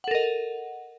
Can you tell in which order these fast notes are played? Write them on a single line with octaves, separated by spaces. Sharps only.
F#5 A4 A#4 D#5